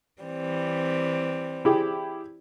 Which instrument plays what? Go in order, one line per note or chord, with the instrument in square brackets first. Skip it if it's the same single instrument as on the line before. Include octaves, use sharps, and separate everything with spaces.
[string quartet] E3 G3 C4
[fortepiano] E4 G4 G#4